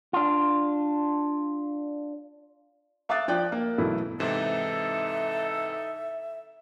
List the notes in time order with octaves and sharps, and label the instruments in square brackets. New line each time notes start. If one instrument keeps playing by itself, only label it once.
[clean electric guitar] D4 F4
[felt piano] E5 F5 D6 D#6 F#6 A6
F3 D5 G5 F#6
A#3
B1 E3 A3 E4
[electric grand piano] G#2 C3 E3 [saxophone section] D#4 A4 [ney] E5